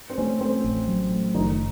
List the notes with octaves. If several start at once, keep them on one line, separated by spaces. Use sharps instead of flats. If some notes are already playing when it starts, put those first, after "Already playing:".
C4
A3 C#4
A3 C4
A1
F#3
A3
F#1 D#3 D#4